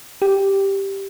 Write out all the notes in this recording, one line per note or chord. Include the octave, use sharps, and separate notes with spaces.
G4